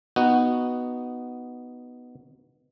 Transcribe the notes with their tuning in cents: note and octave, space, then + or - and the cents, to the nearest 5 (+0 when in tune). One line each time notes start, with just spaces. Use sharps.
B3 +0 D#4 +0 F#4 +0